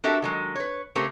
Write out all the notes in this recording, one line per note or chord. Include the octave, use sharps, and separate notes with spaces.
D4 F#4 G4 A4 A#4 E5
D#3 F#3 G#3
B4 C#5
C#3 A3 C#4 G4 A#4 C5